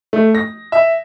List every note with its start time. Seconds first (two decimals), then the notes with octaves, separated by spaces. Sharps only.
0.13 A3
0.35 A#6
0.72 E5